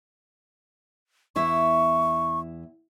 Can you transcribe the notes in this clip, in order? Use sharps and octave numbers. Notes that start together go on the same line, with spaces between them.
E2 E4 E5 C#6